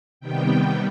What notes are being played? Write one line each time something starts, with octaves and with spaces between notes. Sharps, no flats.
C3 D#3 G3 B3 G5